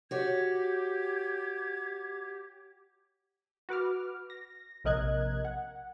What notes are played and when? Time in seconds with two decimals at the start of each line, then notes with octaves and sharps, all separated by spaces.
0.11 F#4 G4 C#5 G#6
3.69 F#4 B4 D6 F6
4.30 A#6
4.84 A#1 C3 A#4 D#5 F#6 G#6
5.45 F#5